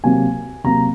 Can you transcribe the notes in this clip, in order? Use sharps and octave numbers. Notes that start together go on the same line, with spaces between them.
C3 F#3 A#3 G#5
C3 F#3 A#3 A#5